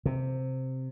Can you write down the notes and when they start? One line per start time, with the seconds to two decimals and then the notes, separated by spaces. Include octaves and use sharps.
0.06 C3